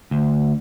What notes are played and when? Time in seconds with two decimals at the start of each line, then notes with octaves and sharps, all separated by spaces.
0.11 D2